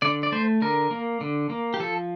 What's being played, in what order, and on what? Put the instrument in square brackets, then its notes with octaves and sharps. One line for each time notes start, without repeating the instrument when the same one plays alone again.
[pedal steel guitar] D3 D5
D5
A3 C5
D3 A#4
A#3
D3
A#3
G4
F3 A4